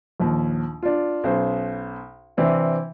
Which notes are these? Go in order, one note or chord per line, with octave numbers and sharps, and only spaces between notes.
A#1 D#2
D4 F4
B1 C#4 C5
C3 E3 C4 D4